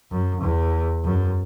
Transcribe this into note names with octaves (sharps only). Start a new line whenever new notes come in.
F#2
E2
F#2